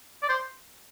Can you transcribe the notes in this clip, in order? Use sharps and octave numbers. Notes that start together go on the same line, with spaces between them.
D5
C5